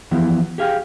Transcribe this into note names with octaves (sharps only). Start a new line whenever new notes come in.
E3 F3 B3 E4 G4
G4 G#4 F5 G5